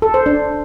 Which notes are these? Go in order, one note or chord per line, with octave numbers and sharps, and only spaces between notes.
A4
C5
D4